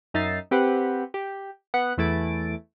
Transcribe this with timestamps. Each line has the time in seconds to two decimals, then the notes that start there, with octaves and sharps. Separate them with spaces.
0.14 F#2 D#4 E5 A6 C7
0.51 C4 G4 B4 F#5
1.14 G4
1.74 B3 F#5 C#7
1.98 E2 E3 A3 E4 A6 D7